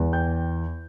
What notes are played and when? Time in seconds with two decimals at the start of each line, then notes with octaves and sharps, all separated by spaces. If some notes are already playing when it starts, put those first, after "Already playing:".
Already playing: E2
0.13 G5 G6